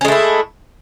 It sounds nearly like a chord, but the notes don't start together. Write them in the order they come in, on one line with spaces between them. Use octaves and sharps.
C#4 G#3 A3 E4